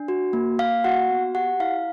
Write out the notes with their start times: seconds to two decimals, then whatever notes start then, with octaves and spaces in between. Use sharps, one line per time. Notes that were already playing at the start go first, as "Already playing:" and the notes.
Already playing: D4
0.08 F#4
0.33 A#3
0.59 A#3 F5
0.84 F#4 F#5
1.10 B3
1.35 G4 F#5
1.60 E4 F5